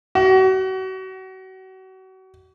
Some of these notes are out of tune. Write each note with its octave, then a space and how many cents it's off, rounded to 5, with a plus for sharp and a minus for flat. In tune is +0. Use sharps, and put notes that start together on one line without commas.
F#4 +35